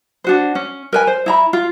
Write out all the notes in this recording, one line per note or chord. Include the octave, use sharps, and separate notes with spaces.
D4 F#4 C5
C#4
A#4 B4 G#5
C5
E4 A#5 B5
F4